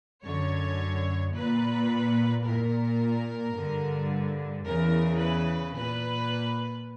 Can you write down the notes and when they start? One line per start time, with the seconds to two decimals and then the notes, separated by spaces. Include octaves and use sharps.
0.23 F#2 D3 C#5
1.34 A#2 B4
2.45 A#2 A#4
3.55 G2 D3
4.66 E2 C#3 E3 A#4
5.22 B4
5.77 A#2 B4